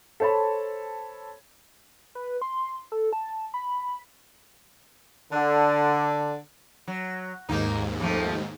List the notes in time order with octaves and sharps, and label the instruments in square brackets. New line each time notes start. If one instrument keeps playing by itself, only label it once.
[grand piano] A4 C5 C#5 A5 B5
[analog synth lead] B4
C6
A4
A5
B5
[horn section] D3
[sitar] F#3
[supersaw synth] D#2 G#2 [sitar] A#3 D#4
[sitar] F2 F3 A3